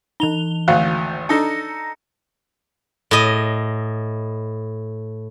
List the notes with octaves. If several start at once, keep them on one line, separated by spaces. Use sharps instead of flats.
E3 D#4 F7 G7
G#1 D2 F5 F#5
D4 D#4 A4 A#5 A#6 C#7
A2 D#5